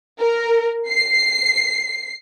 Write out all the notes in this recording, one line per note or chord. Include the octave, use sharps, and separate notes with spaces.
A#4
C7